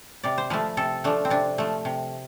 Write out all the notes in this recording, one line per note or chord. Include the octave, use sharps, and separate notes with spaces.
C3 D5
C5
F3 A3 B4
C3 A4
F3 A3 D4
C4
C3 D4
F3 A3
C3